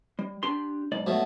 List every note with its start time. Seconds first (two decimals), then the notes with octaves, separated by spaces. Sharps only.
0.19 G3
0.43 D4 G4 C6
0.92 B1 G#2 D5
1.07 B2 F#3 A3